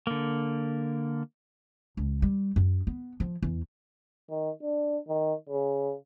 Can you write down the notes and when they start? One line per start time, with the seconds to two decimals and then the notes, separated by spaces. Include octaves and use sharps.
0.07 D3 A#3
1.97 C#2
2.22 G3
2.56 F#2
2.87 B3
3.20 F3
3.43 E2
4.30 D#3
4.63 D4
5.08 D#3
5.50 C#3